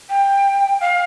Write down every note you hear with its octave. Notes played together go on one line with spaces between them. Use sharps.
G5
F5